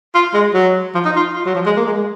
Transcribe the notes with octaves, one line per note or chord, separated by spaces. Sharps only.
F4
G#3
F#3
F3
D#4
F4
F4
F#3
F3
G#3
A#3
G#3
G#3